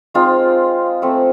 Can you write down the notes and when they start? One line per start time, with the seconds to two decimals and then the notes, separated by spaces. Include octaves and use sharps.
0.14 G#3 C4 D#4 F4
1.02 F3 A3 C4